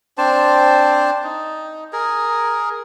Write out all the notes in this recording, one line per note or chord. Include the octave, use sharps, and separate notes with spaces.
C4 D4 C5 A5
D#4
G#4 A#4